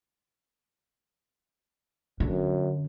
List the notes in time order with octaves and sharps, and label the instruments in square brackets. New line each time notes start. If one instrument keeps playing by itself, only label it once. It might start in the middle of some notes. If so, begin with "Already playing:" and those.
[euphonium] F#2 [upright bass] D3